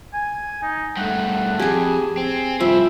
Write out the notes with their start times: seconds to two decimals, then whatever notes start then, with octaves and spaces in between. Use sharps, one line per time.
0.14 G#5
0.62 D#4
0.97 G2 A3 F#5
1.59 F2 G4 G#4 G#5
2.17 C4
2.60 G2 F3 E4 E5